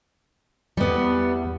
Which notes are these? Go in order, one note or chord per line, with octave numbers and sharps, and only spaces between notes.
E2 G3 B3